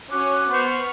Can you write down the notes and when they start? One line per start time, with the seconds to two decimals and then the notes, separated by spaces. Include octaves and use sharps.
0.10 C#4 F#4 D6 F#6
0.52 B3 C5 C#6 F6